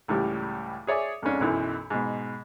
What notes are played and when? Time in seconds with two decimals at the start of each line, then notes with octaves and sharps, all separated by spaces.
0.08 C#2 A2 E3 G3
0.87 G#4 C#5 D5 E5 G#5
1.22 F2 G#2 G#3 C#4 D4
1.41 B1 F#2 E3
1.90 G#2 B2